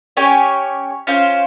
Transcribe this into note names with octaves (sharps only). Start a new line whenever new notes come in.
C#4 G4 C#5 G#5
C#4 F4 C5 F5